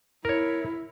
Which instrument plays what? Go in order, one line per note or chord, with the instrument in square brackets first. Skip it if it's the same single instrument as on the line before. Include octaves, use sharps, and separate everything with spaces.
[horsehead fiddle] E4 [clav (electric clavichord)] A#4 C#5